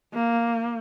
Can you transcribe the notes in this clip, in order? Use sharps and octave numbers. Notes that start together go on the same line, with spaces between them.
A#3